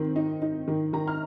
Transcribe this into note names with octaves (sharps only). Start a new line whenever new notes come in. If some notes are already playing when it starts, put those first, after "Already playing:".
Already playing: D#3 C4
D#4
D#4
D#3
D#3 A#5
F6